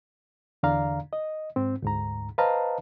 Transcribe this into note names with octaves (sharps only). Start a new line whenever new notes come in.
E2 D3 D4 D5 F5 A#5
D#5
G#2 C4
D2 G#2 A#5
B4 C5 D#5 F5 A5 A#5